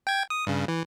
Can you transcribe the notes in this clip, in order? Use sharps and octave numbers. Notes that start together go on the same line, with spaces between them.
G5 G#6
D#6
G2 C#3
E3